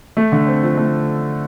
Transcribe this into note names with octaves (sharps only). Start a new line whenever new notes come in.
A3
D3
C4
F3
A3